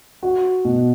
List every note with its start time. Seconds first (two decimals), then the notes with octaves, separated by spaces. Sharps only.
0.23 F#4
0.65 B2